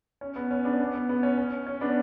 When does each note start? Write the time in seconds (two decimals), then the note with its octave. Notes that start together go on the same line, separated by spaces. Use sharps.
0.21 C#4
0.36 B3
0.51 C#4
0.65 B3 D4
0.80 B3
0.94 B3
1.09 B3
1.23 C#4
1.38 C#4
1.67 C#4
1.81 B3 D4